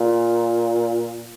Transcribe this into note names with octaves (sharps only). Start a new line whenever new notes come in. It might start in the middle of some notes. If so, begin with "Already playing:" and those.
Already playing: A#2